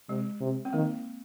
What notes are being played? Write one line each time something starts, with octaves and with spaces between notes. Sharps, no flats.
C3 G#3
C3
C4
D#3 A#3